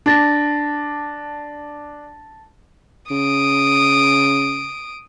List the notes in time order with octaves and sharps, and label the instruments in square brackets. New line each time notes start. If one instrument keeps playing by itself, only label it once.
[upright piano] D4 [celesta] A5 A6 A#6
[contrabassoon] C#3 [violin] D#6 D7